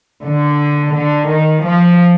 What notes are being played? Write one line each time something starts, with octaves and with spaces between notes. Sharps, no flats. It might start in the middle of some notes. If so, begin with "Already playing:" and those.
D3
D3
D#3
F3